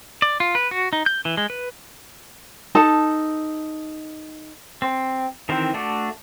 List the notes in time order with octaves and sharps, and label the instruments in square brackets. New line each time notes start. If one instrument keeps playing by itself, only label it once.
[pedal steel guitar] D5
F4
B4
F#4
D#4
G6
E3
G#3
B4
[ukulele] D#4 A4 A5
[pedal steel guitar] C4
D#3 E3 C4 A#4 C5
A3 D4 F#4